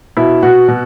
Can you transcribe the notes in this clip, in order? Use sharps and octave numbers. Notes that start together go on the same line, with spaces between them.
B2 E4
B2 F#4
B2